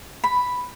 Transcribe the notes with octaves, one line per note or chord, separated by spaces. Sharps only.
B5